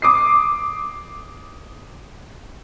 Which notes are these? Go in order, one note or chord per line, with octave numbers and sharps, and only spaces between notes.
D6 D#6 C7